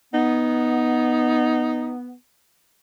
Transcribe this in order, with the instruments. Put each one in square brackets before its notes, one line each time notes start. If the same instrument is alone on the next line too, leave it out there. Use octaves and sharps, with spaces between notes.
[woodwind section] B3 [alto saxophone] D#4